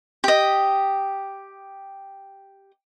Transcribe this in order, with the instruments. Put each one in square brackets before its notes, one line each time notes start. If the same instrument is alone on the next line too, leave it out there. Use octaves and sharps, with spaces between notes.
[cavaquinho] G4 D#5